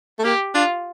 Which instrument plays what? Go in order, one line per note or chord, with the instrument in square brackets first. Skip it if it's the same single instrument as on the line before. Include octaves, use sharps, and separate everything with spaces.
[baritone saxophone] A3
[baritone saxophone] A#3 [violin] G4
[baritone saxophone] D4 [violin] F4